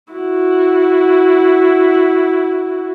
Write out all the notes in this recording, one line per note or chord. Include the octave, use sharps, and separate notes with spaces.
E4 F#4